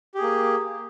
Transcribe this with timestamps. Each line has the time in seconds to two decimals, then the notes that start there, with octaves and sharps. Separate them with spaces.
0.14 G4
0.18 G#4
0.22 A#3